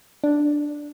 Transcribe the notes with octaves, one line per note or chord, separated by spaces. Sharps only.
D4